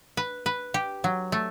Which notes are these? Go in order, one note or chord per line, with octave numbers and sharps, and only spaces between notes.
B4
B4
G4
F#3
A3